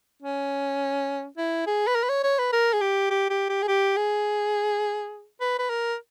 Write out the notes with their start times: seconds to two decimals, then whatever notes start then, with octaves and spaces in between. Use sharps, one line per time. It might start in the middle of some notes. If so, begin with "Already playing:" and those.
0.22 C#4
1.37 E4
1.67 G#4
1.87 B4
1.95 A#4
2.04 B4
2.09 C#5
2.24 C#5
2.39 B4
2.53 A#4
2.73 G#4
2.81 G4
3.10 G4
3.30 G4
3.49 G4
3.62 G#4
3.68 G4
3.96 G#4
5.41 B4
5.59 B4
5.70 A#4